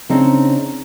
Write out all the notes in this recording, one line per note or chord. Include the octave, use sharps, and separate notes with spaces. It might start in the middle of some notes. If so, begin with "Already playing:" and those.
C#3 C4 D4 D#4